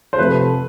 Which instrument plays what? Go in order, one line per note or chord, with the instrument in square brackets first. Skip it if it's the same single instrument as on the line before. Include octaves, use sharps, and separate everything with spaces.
[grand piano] C5
[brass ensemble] C3 F3 A3 [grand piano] B4